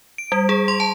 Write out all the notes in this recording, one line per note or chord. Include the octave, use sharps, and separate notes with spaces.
D7
G3
G#4
C6
A5